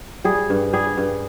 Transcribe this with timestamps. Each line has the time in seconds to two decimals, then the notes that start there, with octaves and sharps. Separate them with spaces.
0.24 G3 G#4
0.50 G2
0.73 G3 G#4
0.97 G2